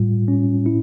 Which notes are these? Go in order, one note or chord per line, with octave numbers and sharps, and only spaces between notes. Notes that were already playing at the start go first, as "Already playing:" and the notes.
Already playing: A2 G3 F4
C#4
E4